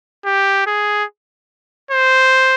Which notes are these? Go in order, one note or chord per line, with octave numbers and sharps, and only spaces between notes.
G4
G#4
C5